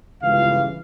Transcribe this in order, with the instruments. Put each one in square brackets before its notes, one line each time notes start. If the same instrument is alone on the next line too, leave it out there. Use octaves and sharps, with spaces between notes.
[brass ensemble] G1 C#2 C#3 E3 F4 F5